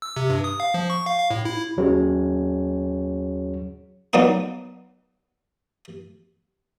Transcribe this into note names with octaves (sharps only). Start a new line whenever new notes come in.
E6
C3
G2
D#6
F5
F3
C#6
F5
F5
A2
E4
D#2 F#3 C#4 G#4 C#5
F#3 A#3 B3 D4 D#4